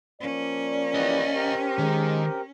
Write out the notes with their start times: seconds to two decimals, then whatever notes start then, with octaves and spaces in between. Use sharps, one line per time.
0.21 F3 A#3 C#4 D5
0.95 E3 G4 B4 C#5 D#5
1.34 C4 G4 A#4
1.78 D#3 G#3